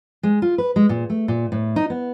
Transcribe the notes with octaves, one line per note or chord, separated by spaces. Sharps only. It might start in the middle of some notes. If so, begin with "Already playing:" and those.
G#3
F4
B4
G#3
A#2
A3
A#2
A2
D#4
B3